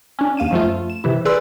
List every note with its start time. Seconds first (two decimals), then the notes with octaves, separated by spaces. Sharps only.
0.19 C#4 D4
0.37 D#2 F5 D#7 E7
0.51 F#2 F3 A3 F4
0.90 E7
1.04 C3 E3 E4
1.25 G#4 B4 D5 C6 E6